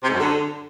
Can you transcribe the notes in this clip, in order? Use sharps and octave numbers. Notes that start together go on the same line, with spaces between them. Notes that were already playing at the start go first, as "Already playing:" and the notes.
C3
G#2
F#2
D3